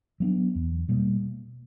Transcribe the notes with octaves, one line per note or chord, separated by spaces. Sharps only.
F#3 B3 D4
E2
B2 G3 A#3